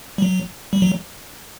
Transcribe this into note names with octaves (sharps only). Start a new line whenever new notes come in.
G3
F#3
G3
F#3